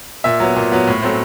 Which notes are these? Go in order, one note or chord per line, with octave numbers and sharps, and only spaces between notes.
A#2 E5
F#3 B3
A#2
F#3 B3
A2
F#3 A3 C4